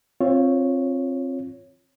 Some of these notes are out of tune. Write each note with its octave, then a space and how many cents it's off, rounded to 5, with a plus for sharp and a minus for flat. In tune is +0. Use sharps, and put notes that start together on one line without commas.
C4 +25 F4 +0 C#5 +0